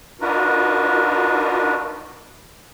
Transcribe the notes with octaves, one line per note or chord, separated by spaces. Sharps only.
D4 D#4 F4 F#4 A#4 B4